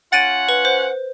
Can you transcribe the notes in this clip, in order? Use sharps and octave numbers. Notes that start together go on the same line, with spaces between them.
C#4 F4 F#5 A6 D7 D#7
B4
C5